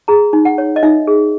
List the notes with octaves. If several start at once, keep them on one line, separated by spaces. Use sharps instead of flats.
G#4 A#5
D#4
F#5
C#5
D#5
D#4 E5
G#4